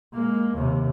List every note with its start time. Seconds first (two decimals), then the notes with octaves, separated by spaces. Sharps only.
0.14 G#3 A#3
0.55 D#2 C3